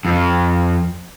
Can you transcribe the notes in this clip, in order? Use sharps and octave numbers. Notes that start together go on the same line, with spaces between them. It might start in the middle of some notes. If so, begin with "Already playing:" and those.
F2